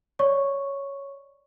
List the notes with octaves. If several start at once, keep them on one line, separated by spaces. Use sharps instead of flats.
C#5 D5 C#6